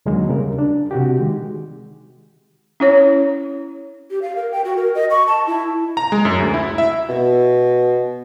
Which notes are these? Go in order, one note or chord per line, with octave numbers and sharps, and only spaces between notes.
D#2 D3 D#3 F#3 G#3 A#3
C#3 G3 A#4
D4
C3 F#4 G4
D#3 G#3
C#4 E4 C#5
G4
F5
A#4
G5
F#4
A#4
D#5
C#6
A5
E4
A#5
G#3
F#2
D2
E4
E5
B2